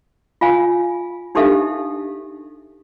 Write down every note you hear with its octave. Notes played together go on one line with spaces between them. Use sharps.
F4 F5 G#5
D4 D#4 G4 A4 E5 F5